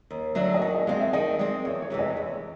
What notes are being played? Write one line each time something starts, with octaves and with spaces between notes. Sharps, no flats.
D#2
D3 F#3 A3 D4
D#5
D#3 D5
D#5
G#3 C4 F5
E5
D#3 D#5
G#3 C4 D5
E2 C#5
C#5
C3 E3 G#3
D#5
E2 C#5